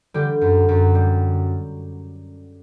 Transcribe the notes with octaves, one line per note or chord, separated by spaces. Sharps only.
D3 G3 G4
F#2
F#2
G3